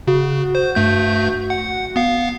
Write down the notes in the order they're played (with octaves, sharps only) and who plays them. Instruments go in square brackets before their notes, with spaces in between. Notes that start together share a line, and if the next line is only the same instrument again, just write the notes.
[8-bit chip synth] C#3 [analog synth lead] F#4
[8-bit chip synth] C5
G2 A3 G6
F#5
B3 F5